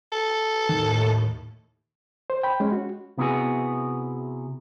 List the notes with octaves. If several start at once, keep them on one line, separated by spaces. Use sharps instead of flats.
A4
D#2 A2 D#3
C5
G5 B5
G#3 C#4
F#4
C3 B3 E4 F#4 G#4